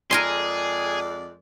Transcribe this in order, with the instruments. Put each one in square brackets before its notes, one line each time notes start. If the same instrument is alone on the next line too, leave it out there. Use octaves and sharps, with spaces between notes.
[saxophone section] F2 G#3 D5 [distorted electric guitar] G#4 [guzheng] A#4 G#5 C6